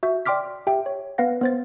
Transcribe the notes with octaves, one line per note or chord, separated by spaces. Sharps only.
F#4 E5 G6
D5 G5 C6 D6 F6 B6
G4 E5 G5
C#5
B3 B4 F5 F#5 A#6
B3 C5 A6